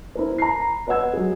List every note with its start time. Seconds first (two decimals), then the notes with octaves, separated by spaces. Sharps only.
0.15 E4 A#4 C5
0.38 A#5 B5 C7
0.87 B4 C#5 D#5 F#5 E6 G#6
1.13 F#3 G#3 G#4